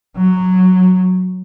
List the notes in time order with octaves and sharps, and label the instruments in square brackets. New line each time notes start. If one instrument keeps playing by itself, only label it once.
[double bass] F#3